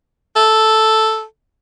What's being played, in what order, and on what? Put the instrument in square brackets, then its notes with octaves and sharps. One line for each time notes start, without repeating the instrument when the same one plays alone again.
[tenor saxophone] A4